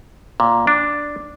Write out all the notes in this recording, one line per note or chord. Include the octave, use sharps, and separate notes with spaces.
A#2
D4